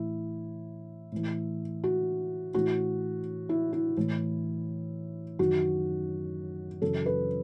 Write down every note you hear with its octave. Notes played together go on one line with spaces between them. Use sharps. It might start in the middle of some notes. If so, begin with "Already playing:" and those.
Already playing: A2 E3 E4
A2 E3
F#4
A2 E3 F#4
E4
E4
A2 E3
F#2 D#3 F#4
F#2 C#3 E3 A4
B4